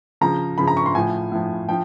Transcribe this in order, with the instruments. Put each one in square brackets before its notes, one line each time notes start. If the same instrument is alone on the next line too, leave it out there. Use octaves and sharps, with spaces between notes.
[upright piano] C#3 F3 A#5
C#3 F3 B5
A#5
C#6
C6
A2 F3 G#5
A2 F3
F3 G5